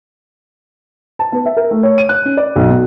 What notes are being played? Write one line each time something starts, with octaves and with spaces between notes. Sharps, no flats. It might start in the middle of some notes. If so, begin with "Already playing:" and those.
A5
B3
E5
A#4
A3
C#5
D#7
F#6
C#4
D5
B1
B2